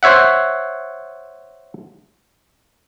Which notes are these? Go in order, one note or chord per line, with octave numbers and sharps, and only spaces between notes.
C5 C#5 E5 F#5